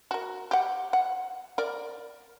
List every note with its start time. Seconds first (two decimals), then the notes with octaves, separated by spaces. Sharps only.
0.11 F#4 A#4
0.51 G4 F#5
0.93 F#5
1.58 A#4 D5